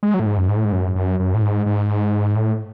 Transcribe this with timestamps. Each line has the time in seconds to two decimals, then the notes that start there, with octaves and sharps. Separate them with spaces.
0.03 G#3
0.14 F#3
0.20 A2
0.26 G#2
0.37 F#2
0.49 G#2
0.57 A2
0.65 G#2
0.72 F#2
0.95 F#2
1.20 F#2
1.34 A2
1.42 G#2
1.66 G#2
2.36 A2